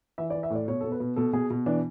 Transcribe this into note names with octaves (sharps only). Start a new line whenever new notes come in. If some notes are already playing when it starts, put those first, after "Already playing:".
E3 E5
D5
E3
E5
A2
D5
B2 C#5
B2 A4
B4
B2
B2 A4
B2 G#4
B2
E3 D4